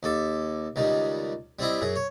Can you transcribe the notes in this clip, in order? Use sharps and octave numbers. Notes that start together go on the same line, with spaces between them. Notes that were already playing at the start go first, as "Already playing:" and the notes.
D#2 A4 D6
C#2 D#3 G3
G3 C4 E4 D#5
F#2 G#4
C#5